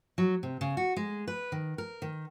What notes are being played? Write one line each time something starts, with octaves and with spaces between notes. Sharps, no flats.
F#3
C3
C#3
F#4
G#3
B4
D#3
A#4
D#3